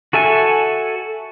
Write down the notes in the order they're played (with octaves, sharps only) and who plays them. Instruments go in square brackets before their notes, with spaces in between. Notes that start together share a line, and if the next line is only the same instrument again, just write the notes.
[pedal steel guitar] F#4 A4 E5 G#5